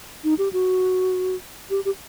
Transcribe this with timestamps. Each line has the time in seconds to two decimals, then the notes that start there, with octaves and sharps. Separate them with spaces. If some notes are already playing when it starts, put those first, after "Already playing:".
0.24 D#4
0.38 G4
0.53 F#4
1.70 G4
1.85 G4